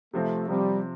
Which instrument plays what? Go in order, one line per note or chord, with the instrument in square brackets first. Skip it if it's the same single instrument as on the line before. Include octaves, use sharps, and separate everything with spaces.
[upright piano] C3 F3 C4 [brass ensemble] A3
[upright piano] C3 F3 C4 [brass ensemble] G3